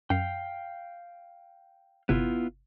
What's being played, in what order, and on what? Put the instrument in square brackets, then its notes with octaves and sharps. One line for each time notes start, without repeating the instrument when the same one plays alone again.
[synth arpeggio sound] F#2 [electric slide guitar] F5 G5
[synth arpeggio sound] G1 C3 [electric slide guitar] B3 E4 F4